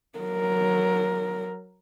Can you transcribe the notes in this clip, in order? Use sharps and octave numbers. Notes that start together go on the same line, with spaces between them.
F#3 A#4